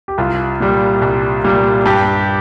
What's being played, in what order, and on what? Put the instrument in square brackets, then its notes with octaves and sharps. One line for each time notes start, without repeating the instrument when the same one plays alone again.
[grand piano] G4
C2 F4
A#2 G3
C2
A#2 G3
G2 G4